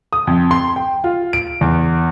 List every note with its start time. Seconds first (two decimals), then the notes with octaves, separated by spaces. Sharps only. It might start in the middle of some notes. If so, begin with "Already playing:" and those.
0.13 D#6
0.27 F2
0.51 C6
0.76 G5
1.04 F4
1.33 D7
1.61 E2